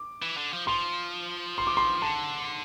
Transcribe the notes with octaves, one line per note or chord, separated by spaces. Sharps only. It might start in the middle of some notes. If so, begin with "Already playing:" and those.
Already playing: D6
E3
D3
F3
F3 C6
C6
D6
C6
D3 A5